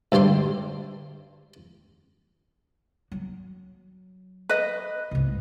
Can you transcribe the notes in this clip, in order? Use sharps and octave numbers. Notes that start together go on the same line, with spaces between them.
D2 G2 G3 C5 C6
F#3
B4 D#5
C2 G#2